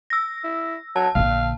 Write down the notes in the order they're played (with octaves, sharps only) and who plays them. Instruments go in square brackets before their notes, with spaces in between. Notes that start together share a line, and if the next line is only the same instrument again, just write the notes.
[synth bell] E6 A#6
[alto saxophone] E4
[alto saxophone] F#3 [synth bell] A5
[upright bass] A#1 D3 [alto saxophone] F5